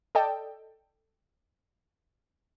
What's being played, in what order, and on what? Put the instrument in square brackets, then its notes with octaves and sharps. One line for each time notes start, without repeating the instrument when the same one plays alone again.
[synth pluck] A4 D5 D#5 G5 A5